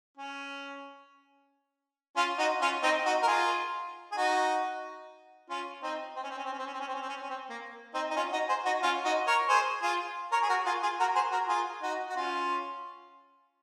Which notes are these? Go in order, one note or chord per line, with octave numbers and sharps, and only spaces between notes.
C#4
C#4 F4
D#4 F#4
C#4 F4
C4 D#4
D#4 F#4
A#4
F4 G#4
G#4
D#4 F#4
C#4 F4
C4 D#4
C4
C#4
C4
C#4
C4
C#4
C4
C#4
C4
C#4
C4
C#4
C4
C#4
C4
C#4
C4
A#3
C4 D#4
D#4
C#4 F4
D#4 F#4
G#4 C5
D#4 F#4
C#4 F4
D#4 F#4
A#4 C#5
G#4 C5
F4 G#4
A#4 C#5
G#4
F#4 A#4
F4 G#4
F4 G#4
F#4 A#4
G#4 C5
F#4 A#4
F4 G#4
D#4 F#4
F#4
C#4 F4